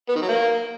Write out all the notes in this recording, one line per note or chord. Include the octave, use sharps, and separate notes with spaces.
B3
D#3
F#3
A#3